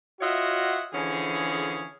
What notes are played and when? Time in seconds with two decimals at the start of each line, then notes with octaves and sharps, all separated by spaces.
0.21 F4 F#4 C#5 D#5 E5 F#5
0.94 D3 E3 F3 C#4 G#4